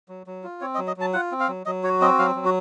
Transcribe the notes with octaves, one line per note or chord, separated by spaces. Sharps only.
F#3
F#3
F4
C4 C#5
D#5
F#3
D#5
F#3 A5
F4 F#5
C4
F5
F#3
F#3 D#5
F#4 C#5
C4 D#5
F#3 F5
F#3
F#4